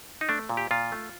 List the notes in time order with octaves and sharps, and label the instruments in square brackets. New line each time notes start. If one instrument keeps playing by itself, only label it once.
[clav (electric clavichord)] D#4
A3 D4
A#2
G4
A#2 F4
A3